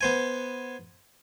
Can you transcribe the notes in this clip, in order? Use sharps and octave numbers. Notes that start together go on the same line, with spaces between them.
B3 C5 G#5